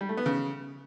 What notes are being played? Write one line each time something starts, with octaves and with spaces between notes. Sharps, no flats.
G3
A3
B3
C#3